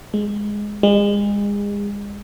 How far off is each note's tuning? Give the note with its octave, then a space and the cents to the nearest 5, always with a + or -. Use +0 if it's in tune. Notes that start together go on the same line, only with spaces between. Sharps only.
G#3 +0
G#3 -35